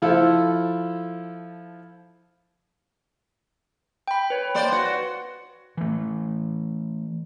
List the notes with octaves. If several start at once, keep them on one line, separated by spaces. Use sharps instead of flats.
F3 E4 F4 A4
G5 B5
B4 C#5
A#3 C5 D5
F#4
E3 A3